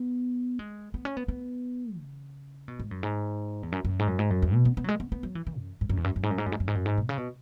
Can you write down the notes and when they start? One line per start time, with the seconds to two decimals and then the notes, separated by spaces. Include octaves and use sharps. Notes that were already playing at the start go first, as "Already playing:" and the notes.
Already playing: B3
0.59 G#3
0.94 B3
1.05 C#4
1.17 B3
1.28 B3
1.98 C#3
2.68 B2
2.80 G#2
2.91 F#2
3.03 G#2
3.63 E2
3.72 F#2
3.85 F#2
3.99 G#2
4.08 F#2
4.19 G#2
4.30 F#2
4.42 E2
4.54 B2
4.65 B3
4.77 B3
4.84 F#3
4.89 G#3
5.00 B3
5.12 B3
5.23 F#3
5.35 E3
5.47 E3
5.58 F#2
5.81 G#2
5.89 F#2
5.97 E2
6.04 F#2
6.16 F#2
6.23 G#2
6.31 F#2
6.38 G#2
6.46 F#2
6.52 G#2
6.60 F#2
6.68 G#2
6.75 F#2
6.86 G#2
6.98 B2
7.09 C#3
7.18 B2